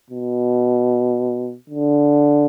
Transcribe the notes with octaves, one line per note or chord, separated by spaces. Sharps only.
B2
D3